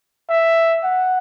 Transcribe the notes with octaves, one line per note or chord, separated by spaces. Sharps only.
E5
F#5